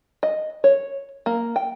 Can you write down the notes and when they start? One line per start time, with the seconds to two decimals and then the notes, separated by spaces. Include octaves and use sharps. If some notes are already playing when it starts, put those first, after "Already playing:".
0.23 D#5
0.64 C#5
1.26 A#3
1.56 G5